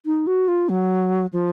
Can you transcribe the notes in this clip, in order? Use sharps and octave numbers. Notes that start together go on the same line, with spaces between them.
D#4
F#4
F4
F#3
F3